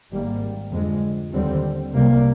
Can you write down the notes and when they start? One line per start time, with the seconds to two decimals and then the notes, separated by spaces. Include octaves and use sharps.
0.12 G#1 G#2 G3 A#3
0.71 F2 D3 G#3
1.32 D#2 D3 G3 C4
1.93 C2 C3 G3 A#3